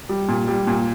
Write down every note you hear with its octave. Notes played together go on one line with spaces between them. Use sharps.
G3
A#2
G3
A#2